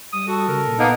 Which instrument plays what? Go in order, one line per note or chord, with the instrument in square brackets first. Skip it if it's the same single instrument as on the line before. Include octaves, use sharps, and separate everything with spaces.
[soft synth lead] G3 [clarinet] D#6
[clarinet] F#4 [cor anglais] A4
[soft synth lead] C#3 [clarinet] A#4
[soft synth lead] A#2
[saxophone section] A#3 B3 D#4